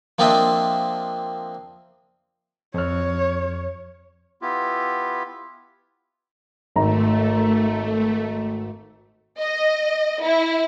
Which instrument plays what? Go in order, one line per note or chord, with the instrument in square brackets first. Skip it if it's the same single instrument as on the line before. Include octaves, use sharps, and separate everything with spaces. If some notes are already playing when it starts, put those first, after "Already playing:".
[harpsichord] F3 A#3 C4 D4 D#5 E5
[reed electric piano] F2 F6 [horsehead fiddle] C#5
[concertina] B3 E4 F4 G4
[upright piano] G#1 A#5 [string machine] A3
[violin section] D#5
E4